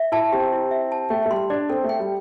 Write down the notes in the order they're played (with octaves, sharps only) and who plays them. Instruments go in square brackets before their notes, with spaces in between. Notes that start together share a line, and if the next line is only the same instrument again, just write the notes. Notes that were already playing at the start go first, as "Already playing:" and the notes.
Already playing: [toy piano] E5
[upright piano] E4 [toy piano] A5
[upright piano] C4 [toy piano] G4
[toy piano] E4
E5
A5
[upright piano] A3 [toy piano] G5
[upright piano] A3
[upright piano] G3 [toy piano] C6
[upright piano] D4 [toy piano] D5
[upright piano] C4 [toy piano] A4
[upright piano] A3
[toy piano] G5
[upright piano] G3